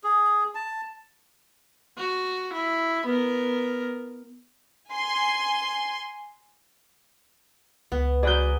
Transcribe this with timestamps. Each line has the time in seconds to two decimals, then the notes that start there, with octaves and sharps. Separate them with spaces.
0.04 G#4
0.55 A5
1.98 F#4
2.53 E4
3.05 B3 A#4
4.91 G#5 C6
7.92 C#2 B3
8.23 F#3 G#4 B4 D5 G6